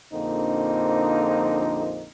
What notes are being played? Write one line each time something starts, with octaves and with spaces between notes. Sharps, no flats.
A#1 F2 D3 A#3 C4 D#4